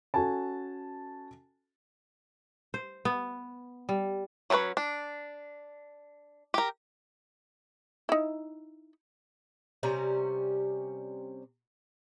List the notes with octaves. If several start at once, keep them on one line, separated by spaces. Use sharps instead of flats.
C#4 F#4 A4 G#5 A5
C5
B3
G3
F#3 C#4 A4 B4 C#5
D4
G4 A#4
D#4 E4
C3 G3 C#4 A#5